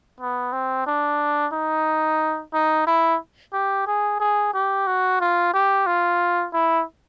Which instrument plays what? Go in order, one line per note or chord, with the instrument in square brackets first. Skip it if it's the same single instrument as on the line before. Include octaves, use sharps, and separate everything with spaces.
[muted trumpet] B3
C4
D4
D#4
D#4
E4
G4
G#4
G#4
G4
F#4
F4
G4
F4
E4